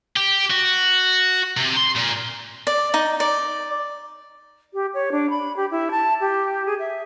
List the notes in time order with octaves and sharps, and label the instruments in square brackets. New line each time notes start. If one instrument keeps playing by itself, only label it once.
[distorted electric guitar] G4
F#4
C3
C6
A#2
[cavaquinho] D5
D#4
D5
[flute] G4
C#5
D4
B5
G4
E4
A5
G4
G#4
E5